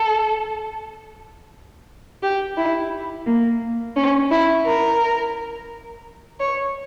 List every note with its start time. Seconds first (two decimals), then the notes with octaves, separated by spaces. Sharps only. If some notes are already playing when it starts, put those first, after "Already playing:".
Already playing: A4
2.22 G4
2.57 E4
3.26 A#3
3.96 C#4
4.31 E4
4.66 A#4
6.39 C#5